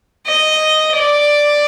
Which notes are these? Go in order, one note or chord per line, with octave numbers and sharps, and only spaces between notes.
D#5
D5